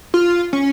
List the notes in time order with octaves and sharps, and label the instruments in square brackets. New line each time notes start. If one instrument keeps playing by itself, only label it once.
[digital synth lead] F4
C#4